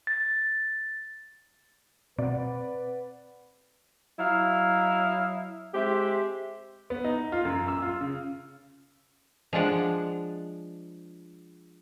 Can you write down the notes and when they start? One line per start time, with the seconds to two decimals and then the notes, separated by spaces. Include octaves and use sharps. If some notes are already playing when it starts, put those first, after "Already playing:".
0.07 A6
2.19 B2 C4 B4 D5 F#5
4.19 F#3 E4 D#5 F5
5.74 G#3 C4 G4 E5
6.90 B3
7.04 D#4
7.32 F4
7.45 F#2
7.68 E6
7.82 F4
8.01 C#3
9.53 F3 G#3 D4 F#5